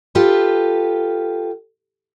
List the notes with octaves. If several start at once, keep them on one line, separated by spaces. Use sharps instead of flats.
F4 G4 A4 B4